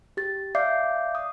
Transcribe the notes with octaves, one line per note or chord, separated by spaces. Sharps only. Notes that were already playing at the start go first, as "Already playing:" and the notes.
G4 A6
D5 E5 F5 D6 G6 C7
D#6